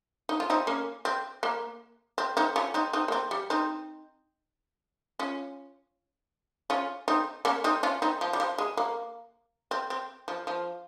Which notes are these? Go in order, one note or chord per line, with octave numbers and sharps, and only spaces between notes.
D#4
F4
C4 D#4
A#3 C#4
C4
A#3
C4
C4 D#4
C#4 F4
C4 D#4
C4 D#4
A#3
C4
G3
C4 D#4
C#4 F4
C#4 F4
C4 D#4
A#3 C#4
C4 D#4
C#4 F4
C4 D#4
F3
G3
F3
G#3
A#3
C4
C4
F3
F3